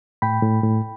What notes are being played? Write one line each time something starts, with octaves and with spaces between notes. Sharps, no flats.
A2 G5 B5
A2
A2